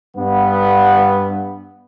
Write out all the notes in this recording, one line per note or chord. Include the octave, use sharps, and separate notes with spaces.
G2 B3